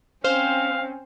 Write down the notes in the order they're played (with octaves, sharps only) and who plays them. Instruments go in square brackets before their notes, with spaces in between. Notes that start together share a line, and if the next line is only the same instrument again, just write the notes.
[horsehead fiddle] C4 C#4 [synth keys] C5 [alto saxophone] F5